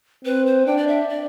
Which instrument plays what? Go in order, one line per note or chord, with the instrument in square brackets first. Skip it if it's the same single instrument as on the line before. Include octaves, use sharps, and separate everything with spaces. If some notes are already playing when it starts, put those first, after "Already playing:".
[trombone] C4 [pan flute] B4
[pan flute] C5
[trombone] D4 [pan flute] G5
[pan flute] D5
E5
D5